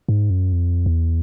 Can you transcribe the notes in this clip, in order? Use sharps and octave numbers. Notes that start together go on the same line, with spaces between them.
G#2
F#2
F2
E2